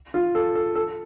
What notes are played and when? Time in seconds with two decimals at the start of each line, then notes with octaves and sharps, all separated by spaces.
0.14 F4
0.35 A4
0.55 A4
0.75 A4